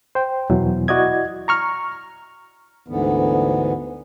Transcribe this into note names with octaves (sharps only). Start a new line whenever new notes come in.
C5 G5
E2 B2 E3 F#3
E4 F#4 D5 D#5 G#6
A#5 C#6 F6
D2 G#2 D3 E3 B3